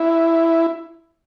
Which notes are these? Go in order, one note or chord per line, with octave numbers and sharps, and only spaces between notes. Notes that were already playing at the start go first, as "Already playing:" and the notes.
Already playing: E4